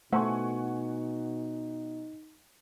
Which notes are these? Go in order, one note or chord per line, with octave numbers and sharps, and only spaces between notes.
B2 A3 D#4 C5 F#5 G#5 C#6